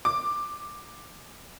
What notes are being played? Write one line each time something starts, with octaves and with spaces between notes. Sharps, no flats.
D6